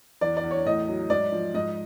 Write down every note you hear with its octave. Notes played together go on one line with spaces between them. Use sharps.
E2 D5
D5
E2
C#5
A2 D#5
F#3
G#2 D5
F3
G#2 D#5